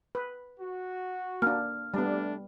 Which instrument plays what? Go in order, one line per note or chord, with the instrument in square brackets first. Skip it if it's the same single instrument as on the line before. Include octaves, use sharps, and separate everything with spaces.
[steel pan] B4
[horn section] F#4
[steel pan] A#3 D4 [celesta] F6
[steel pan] G3 B3 [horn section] A3 D4